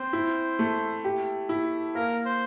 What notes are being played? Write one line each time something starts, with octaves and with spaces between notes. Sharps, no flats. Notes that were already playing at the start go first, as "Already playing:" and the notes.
Already playing: C4 C5
E4
A3
G4
E4
A#3 A#4
C5